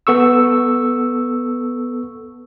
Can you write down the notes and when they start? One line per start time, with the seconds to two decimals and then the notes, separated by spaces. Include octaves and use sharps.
0.07 B3 A4 C#6 E6